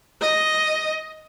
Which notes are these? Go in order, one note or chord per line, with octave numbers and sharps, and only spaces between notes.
D#5